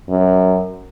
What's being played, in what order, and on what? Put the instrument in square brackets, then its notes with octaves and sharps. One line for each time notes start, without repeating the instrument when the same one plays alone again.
[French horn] F#2